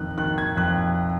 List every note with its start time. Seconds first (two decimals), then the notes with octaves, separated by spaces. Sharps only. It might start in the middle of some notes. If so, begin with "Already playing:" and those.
Already playing: F2 D#3 F#6
0.18 D#3 F#6
0.38 G#6
0.57 F2 F#6